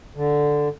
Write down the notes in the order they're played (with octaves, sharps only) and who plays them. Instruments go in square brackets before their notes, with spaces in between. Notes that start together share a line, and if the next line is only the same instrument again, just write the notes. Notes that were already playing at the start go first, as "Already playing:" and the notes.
[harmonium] D3